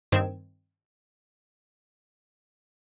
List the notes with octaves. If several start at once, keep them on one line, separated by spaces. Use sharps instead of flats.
G2 D#3 C4 G#6 D7 E7